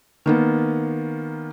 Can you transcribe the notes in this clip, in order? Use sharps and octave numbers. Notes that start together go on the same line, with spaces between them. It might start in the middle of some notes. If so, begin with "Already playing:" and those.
D#3 A#3 B3